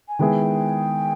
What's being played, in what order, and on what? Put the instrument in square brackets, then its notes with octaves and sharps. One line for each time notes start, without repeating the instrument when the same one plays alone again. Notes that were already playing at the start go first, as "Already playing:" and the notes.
[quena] G#5
[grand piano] D#3 G#3 B3 E4 G#4 [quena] G5